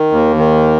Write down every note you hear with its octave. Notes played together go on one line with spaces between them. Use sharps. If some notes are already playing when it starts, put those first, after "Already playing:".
Already playing: D#3
D#2
D#3